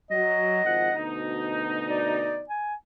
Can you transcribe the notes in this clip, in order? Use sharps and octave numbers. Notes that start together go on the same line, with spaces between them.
F#3 D#5
G#1 F3 F#5
D2 B2 D#4
D5
G#5